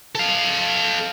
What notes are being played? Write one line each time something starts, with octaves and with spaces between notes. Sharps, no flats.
A4 F5